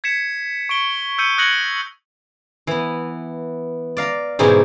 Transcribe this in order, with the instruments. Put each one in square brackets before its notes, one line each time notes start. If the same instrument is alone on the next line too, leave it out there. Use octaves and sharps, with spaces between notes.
[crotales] G#6 B6 C#7 E7
C#6 D7 G7
E6 G6 C#7 D#7 G7
D#6 F#6 G#6 A#6 C#7 F#7
[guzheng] E3 B3
D5 F5 A#5
G#2 B2 E3 D#4 G4 G#4